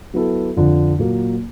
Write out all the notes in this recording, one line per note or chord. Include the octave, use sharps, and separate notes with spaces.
F#3 B3 E4 A4
F2 D3 F3
A#2 F#3 A#3